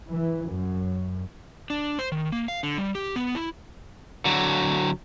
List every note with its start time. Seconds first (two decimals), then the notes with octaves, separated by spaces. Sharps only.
0.10 E3
0.46 F#2
1.70 D4
1.99 C5
2.12 D#3
2.32 A#3
2.48 F5
2.63 D3
2.78 G3
2.95 G4
3.16 B3
3.35 E4
4.25 D3 F#3